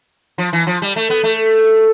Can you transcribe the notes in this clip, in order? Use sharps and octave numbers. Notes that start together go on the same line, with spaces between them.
F3
E3
F3
G3
A3
B3
A3